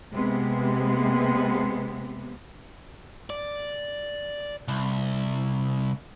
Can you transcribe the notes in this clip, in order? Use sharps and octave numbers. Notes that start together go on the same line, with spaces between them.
C3 G#3 A#3 B3
D5
C2